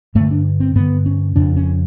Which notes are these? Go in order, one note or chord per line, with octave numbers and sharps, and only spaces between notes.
G2 D3 A3
D4
C4
G2 D3 B3
C#4
F2 C#3 D4
C#4